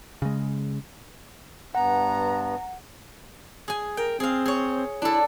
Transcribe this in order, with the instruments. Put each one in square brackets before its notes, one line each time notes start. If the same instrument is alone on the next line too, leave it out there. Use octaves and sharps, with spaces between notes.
[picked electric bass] C#3 G#3
[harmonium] G2 B3 [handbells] F#5 [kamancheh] A#5
[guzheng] G#4 G#5
[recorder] A#4 [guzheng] G5
[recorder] C4 [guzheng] G#4 F5
[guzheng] G#4 C#5
[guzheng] D4 A4 [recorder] E4